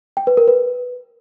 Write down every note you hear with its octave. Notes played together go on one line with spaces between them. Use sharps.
G5
B4
A#4
B4